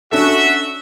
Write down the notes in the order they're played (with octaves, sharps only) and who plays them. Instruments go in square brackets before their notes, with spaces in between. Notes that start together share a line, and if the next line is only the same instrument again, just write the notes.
[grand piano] C#4 D4 A4 [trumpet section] F#4 E5